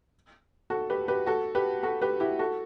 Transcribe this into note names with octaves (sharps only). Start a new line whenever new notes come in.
F#4 A4
G4 B4
G4 B4
F#4 A4
G4 B4
F#4 A4
G4 B4
E4 G4
F#4 A4